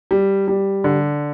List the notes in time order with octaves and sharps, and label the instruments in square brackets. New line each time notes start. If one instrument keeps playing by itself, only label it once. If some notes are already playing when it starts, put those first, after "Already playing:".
[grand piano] G3
G3
D3